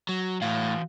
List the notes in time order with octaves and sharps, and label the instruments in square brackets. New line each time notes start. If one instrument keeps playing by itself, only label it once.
[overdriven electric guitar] F#3
[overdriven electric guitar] A2 [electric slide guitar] E3 F#4 F5